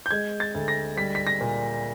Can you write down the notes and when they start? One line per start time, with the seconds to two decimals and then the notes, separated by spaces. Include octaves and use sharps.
0.06 G6
0.11 G#3 G#6
0.40 A6
0.54 D2
0.68 A#6
0.97 G3 B6
1.15 B6
1.27 A#6
1.41 A#2